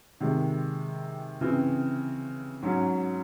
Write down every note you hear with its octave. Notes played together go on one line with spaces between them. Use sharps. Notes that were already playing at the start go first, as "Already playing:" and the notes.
C3 D#3 G#3
C#3 E3 C4
G#2 F#3 C#4